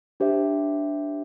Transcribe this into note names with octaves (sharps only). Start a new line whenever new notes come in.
D4 G4 C5 E5